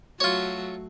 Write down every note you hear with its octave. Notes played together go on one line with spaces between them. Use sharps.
F#3 A3 F4 F#4 C#5